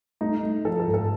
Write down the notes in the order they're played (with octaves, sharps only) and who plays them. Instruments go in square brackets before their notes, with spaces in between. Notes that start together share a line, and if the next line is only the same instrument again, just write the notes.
[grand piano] A3 [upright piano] D#4
[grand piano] A3
[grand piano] F3 [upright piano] A4
[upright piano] A4
[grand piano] G#2
[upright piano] A4